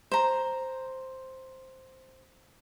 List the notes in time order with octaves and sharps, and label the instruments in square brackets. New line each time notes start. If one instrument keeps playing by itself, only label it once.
[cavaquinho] C5 A#5